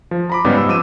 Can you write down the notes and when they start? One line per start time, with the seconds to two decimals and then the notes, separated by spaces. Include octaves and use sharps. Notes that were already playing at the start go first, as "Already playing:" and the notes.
0.11 F3
0.30 A#5 B5 D6
0.45 G#2 C#3 G3 B3 D#4
0.57 E6
0.68 F3 D6 E6 D#7